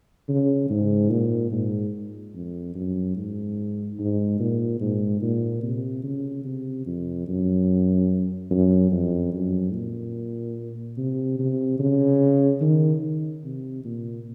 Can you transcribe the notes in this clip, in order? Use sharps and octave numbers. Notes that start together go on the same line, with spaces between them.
C#3
G#2
A#2
G#2
F2
F#2
G#2
G#2
A#2
G#2
A#2
C3
C#3
C3
F2
F#2
F#2
F2
F#2
A#2
C3
C3
C#3
D#3
C3
A#2